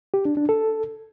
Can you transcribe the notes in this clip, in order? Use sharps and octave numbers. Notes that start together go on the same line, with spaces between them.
G4
D4
D4
A4